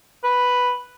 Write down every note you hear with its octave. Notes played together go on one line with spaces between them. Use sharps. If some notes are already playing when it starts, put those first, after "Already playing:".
B4